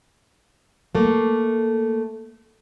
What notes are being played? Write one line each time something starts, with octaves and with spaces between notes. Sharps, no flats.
A3 A#3